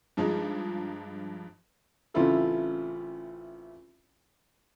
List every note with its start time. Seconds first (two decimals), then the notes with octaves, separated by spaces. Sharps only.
0.17 G2 F3 G#3 D#4
2.14 A1 C#3 C4 E4 F4 A4